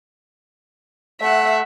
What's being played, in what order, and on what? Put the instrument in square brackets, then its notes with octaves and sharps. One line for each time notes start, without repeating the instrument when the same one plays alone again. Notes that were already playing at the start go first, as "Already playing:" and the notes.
[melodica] A3 [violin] E5 F#5